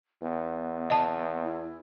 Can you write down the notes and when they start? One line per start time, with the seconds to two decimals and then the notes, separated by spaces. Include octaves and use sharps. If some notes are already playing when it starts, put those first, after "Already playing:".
0.22 E2 B3
0.90 D#5 A5
1.44 E4